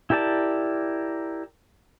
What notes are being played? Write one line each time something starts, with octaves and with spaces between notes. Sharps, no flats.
E4 G4 A#4 D5 A5